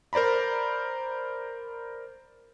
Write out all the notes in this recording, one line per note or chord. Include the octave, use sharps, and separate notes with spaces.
A#4 C5 D5 A#5 B5